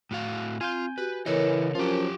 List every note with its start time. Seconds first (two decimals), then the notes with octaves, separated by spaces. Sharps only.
0.11 A2 F#4 F5
0.61 C4 F4 F5 G#5 G6
0.98 F#4 G4 B4
1.26 C#3 E3 A4 A#4 C#5 D#5
1.75 F3 F#3 C#4 F4 G4